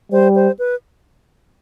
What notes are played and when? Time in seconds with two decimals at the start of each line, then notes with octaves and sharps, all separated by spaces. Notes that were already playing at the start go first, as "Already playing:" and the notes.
0.12 G3 C5
0.35 C5
0.59 B4